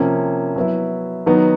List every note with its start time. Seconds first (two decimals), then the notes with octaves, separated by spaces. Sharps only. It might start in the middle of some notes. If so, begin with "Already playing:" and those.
Already playing: C3 F3 A#3 C#4
0.56 F#3 B3 E4
1.26 D#3 F#3 B3 D#4